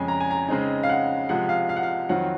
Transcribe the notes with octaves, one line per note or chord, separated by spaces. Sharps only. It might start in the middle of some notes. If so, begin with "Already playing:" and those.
Already playing: F2 C#3 G#3 C#4 G#5
A#5
G#5
A#5
C#3 G#3 C4 D#4
F5
F#5
C3 F3 G#3 F#5
F5
F5
F#5
F5
F2 D#3 F#3 C4 F4 F#5